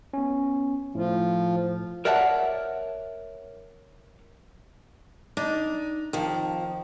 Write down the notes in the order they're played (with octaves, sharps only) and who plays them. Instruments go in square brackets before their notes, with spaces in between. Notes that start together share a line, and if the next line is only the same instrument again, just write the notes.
[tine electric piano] B3 C#4
[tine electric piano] A2 [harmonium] F3
[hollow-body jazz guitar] A#4 C#5 D5 E5 F#5 A5
[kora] D4 [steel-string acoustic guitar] D#4
[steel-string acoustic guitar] F2 F3 [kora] D#3